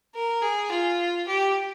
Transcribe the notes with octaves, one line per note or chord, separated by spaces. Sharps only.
A#4
G#4
F4
G4